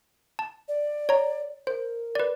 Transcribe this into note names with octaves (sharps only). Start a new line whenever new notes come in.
A5
D5
C#5 A#5
A#4 C5
B4 D5